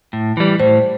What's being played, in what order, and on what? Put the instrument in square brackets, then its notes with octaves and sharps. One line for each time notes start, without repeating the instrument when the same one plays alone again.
[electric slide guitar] A2
E3 G3
[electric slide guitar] A2 [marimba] C5